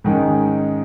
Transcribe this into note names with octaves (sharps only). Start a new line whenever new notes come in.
G#2 D#3 G#3 C#4